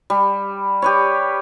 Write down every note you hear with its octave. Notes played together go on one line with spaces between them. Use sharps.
G3
G4 B4 C#5